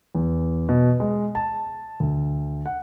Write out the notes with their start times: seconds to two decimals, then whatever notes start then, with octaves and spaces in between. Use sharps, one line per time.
0.15 E2
0.69 B2
1.00 G#3
1.35 A5
2.00 D2
2.66 F#5